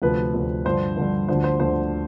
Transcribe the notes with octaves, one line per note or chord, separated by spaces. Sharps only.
D2 C3 F3 B4
D2 C3 F3
G2 D3 F3 C5
G2 D3 F3
D2 D3 F3 C5
C5
D2 D3 F3 C5